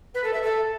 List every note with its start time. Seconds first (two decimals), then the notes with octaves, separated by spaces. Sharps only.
0.15 B4
0.24 A4
0.33 E5
0.43 A4